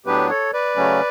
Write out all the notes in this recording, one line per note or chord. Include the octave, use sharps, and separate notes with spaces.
A2 F#3 B3 D4 G4 B4
A4 C#5
B4 D5
C#3 F#3 A3 C#4